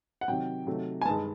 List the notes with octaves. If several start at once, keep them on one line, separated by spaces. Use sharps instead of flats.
F#5
C3 D#3 F#3 G5
C3 D#3 F#3 A3
G#5
G2 D#3 G#3 A5